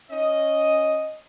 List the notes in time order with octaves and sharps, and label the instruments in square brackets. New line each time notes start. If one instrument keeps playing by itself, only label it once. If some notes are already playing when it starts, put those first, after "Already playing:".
[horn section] C#4 D#5